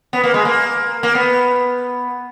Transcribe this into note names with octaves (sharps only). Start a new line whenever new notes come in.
B3
A#3
G#3
A#3
A#3
B3